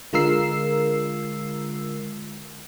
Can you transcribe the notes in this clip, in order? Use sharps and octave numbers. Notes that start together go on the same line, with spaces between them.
D3 G#3 F4 A#4 E6 C7